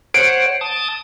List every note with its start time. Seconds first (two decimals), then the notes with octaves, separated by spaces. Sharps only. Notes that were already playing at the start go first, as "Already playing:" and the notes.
0.14 C5 C#5 F#5 D7
0.61 A5 D#6